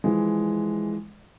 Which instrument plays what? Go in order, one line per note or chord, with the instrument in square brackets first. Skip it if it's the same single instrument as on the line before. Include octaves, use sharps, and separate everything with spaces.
[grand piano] E3 F3 G#3